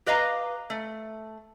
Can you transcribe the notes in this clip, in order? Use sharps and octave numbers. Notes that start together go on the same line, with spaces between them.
G4 B4 D#5 F5 A#5
A3